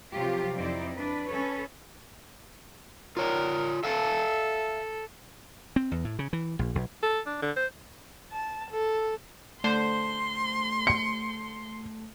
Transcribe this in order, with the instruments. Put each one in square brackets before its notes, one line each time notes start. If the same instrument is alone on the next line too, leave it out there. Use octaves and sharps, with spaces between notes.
[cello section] C3 F3 F#3 F4 G4
F2 C4 D#4 E4 C5 D5
D4 B4
C#4 A4 B4 C#5
[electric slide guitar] F4 C#5 D5 [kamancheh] A#4
[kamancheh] A4 [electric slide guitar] E5 F5 A5
[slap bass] C4
E2
A2
C#3
E3
A#1
B1
[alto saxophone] A4
D4
D3
C5
[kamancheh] A5
A4
[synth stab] D3 C5 [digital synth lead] A3 [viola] C6
[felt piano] C#7